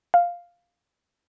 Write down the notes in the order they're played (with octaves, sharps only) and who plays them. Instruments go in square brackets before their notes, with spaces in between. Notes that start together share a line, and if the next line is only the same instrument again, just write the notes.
[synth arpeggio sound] F5